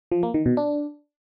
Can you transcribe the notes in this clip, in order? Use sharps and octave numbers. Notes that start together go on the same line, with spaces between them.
F3
A#3
D#3
B2
D4